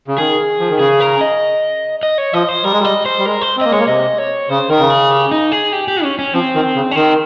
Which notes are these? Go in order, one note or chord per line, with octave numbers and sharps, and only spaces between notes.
C#3
D#3 G#4
F3
D#3
C#3 G#4
A#4
D#5
D#5
C#5
F3 D#5
C5
G3 A#4
G#3
G3 D#5
C5
G3
G#3 A#4
C5
C4
A#3 D#5
G#3 C#5
A#3
C3 D#5
C#5
C#3 C5
D#3 A#4
C#3
G#4
G4
D#4
G#4
G4
G4
C#4
C#4
F3 C4
D#3
C#3
C#4
D#3 C4